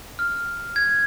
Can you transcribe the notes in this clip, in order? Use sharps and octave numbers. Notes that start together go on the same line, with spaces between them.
F6
G#6